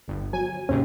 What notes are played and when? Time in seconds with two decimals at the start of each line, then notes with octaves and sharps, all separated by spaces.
0.08 G1
0.33 F#3 G#5
0.69 D#2 G#2 C3 C#4